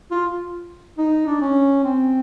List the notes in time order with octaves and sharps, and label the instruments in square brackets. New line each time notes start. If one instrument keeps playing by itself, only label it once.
[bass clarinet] F4
D#4
D4
C#4
C4